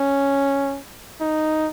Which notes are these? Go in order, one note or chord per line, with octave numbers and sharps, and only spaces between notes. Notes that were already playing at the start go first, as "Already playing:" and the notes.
Already playing: C#4
D#4